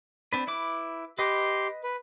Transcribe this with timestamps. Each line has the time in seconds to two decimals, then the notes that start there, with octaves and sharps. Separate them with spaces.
0.33 C4 D4 B4
0.47 E4 B4 D6
1.19 G4 B4 D#5 C6
1.83 B4